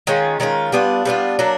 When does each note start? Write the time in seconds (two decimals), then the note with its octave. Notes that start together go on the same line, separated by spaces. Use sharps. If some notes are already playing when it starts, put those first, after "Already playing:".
0.07 D#3 G#3 C#4 F4
0.40 D#3 G#3 C#4 F4
0.72 G3 B3 D4 F4
1.05 G3 B3 D4 F4
1.39 F#3 A#3 D4